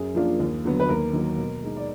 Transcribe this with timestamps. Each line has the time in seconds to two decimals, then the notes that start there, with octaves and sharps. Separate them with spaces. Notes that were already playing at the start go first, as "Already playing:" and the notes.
Already playing: F#2 G#4
0.15 F3 A#3 D4 F4
0.40 D#2
0.65 D3 F#3 B3
0.80 B4
0.89 D#2 A#4
1.13 D#3 F#3 A#3
1.38 B2
1.62 G#3 D#4
1.76 D5